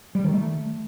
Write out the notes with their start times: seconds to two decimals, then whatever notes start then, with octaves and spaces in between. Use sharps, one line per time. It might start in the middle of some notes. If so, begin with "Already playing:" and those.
0.15 G3
0.24 D#3
0.33 A3